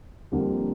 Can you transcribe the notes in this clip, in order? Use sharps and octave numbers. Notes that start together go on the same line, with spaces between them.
F2 D3 G3 A#3